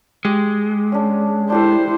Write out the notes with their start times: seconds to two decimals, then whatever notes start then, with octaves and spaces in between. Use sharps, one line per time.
0.25 G#3 G4
0.92 C#4 D4
1.50 D4 E4 G4 A4 C5